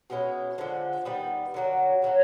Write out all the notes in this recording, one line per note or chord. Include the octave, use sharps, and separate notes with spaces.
B2 G#3 C#4 E4
D3 F3 G#3
D#3 G3 B3
D3 F#3 A#3
C#3 F#3 A3